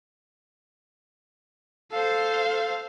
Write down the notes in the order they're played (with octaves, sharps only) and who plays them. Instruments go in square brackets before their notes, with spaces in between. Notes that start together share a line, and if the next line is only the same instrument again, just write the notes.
[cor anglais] A4 [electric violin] C5 F5